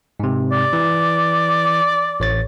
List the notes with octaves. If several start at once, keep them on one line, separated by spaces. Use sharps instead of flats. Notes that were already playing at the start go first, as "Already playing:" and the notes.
G#2 C3
D5
E3
A1 C#5 A6